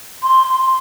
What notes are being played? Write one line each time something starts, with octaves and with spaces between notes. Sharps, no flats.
C6
C6